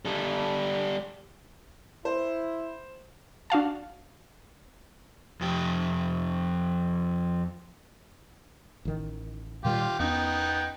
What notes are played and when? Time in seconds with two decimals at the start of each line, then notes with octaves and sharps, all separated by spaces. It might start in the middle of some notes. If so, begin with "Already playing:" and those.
0.05 G3 A4
2.05 E4 C5
3.50 D4 F#4 F5 A5
5.41 F2 G4
8.85 A1 D#3
9.65 A#2 D#3 G3 F4 G4
10.00 E2 B3 C#4 D#4 G5